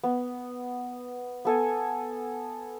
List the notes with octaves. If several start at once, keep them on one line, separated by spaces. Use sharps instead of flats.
B3
B3 A4 G#5